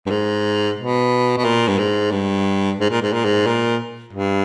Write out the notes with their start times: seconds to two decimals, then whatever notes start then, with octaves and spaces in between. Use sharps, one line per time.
0.06 G2
0.10 G#2
0.78 B2
1.37 B2
1.45 A#2
1.68 G2
1.79 G#2
2.11 G2
2.80 G#2
2.90 A#2
3.02 G#2
3.13 A#2
3.25 G#2
3.47 A#2
4.13 G2